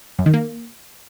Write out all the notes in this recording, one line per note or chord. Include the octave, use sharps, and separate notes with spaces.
F#2
D#3
A#3